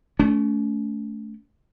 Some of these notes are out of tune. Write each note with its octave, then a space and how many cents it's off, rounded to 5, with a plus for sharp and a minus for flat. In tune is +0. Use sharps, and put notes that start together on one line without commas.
A3 -15 C#4 +40